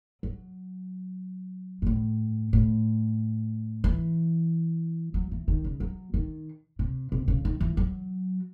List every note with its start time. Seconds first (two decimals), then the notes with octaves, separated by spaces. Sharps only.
0.23 F#3
1.82 G#2
1.86 A2
2.53 A2
3.84 E3
5.14 F#3
5.32 E3
5.48 D#3
5.64 C#3
5.80 F#3
6.14 D#3
6.79 C3
7.12 C3
7.28 C#3
7.45 D#3
7.61 E3
7.77 F#3